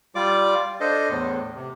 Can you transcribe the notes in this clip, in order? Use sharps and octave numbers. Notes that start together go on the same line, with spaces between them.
G3 F4 D5 D6
D4 A4 C5 D#5
E2 A2
C3